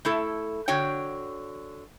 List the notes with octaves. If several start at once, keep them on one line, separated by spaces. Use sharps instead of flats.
A3 E4 A4
D3 F#4 C#5 G5